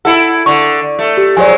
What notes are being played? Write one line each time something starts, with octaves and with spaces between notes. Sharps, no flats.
E4 A4 F#5
D3 C#6
A3
G4
F3 F#3 G#3 D5 G#5